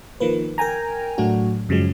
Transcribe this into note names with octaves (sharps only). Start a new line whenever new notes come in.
D#3 F3 A#3 B4
A#4 G5 G#5 A#5
A2 F#3 A3 D4 F#4
F#2 C#3 F3 F#3 G#3